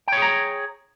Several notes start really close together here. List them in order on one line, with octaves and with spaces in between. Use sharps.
G5 C#5 G#4 A#5